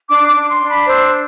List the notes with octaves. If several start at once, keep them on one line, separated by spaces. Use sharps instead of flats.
D4 D6
D6
D4
C6
D4
B5
C5 E6